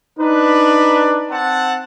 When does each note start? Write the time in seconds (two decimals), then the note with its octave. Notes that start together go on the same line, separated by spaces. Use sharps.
0.19 D4 D#4 B4
1.31 C4 F#5 A5